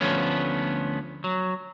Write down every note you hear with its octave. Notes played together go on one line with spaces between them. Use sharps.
D2 F3 A3 B3 C#4
F#3